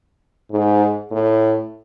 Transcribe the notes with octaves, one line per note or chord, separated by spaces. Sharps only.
G#2
A2